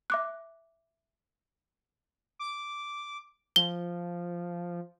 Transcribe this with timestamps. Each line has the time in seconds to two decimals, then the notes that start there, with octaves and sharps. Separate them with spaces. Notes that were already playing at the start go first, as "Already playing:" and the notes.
0.10 E5 D6 F#6
2.39 D6
3.56 F3 G7